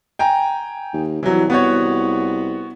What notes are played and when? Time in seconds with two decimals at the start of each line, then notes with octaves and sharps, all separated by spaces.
0.19 G5 G#5 A#5
0.93 D#2
1.23 C2 E3 F#3
1.50 B3 F#4 C#5